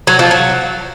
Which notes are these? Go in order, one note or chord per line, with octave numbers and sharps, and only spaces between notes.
F#3
F3
F#3